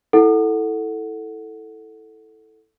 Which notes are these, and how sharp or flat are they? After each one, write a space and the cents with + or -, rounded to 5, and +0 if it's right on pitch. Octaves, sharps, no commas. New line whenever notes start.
E4 -10 A4 +0 F#5 +0